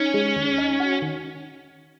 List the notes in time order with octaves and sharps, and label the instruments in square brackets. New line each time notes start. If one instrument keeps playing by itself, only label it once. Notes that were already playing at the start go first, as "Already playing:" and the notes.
Already playing: [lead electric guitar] C#4 [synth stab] D#4
[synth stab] G#3
D#2
D#4
F#4
D#3